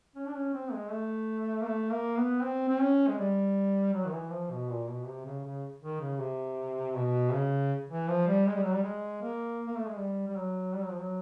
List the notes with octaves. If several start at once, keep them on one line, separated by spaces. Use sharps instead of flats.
C#4
D4
C#4
C4
G#3
A3
A#3
A3
A#3
B3
C4
C4
C#4
G#3
G3
F#3
D#3
E3
F3
B2
A#2
B2
C3
C#3
C#3
D#3
C#3
C3
B2
C#3
E3
F3
G3
G#3
G3
F#3
G3
G#3
A#3
A#3
A3
G#3
G3
G3
F#3
G3
F#3
F3
F#3